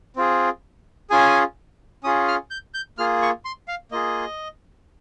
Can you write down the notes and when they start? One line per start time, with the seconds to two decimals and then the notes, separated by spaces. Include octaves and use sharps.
0.16 C4 F4 G#4
1.10 C#4 F4 G#4 G#5
2.04 C#4 F4 G#4 D#6
2.28 F6
2.51 G6
2.74 G6
2.98 A#3 F4 G#4 F6
3.22 C#6
3.45 C6
3.68 F5
3.92 A#3 F4 G#4 D#5